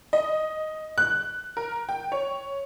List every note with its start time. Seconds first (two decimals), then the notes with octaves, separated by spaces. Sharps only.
0.13 D#5
0.98 F#6
1.57 A#4
1.89 G5
2.12 C#5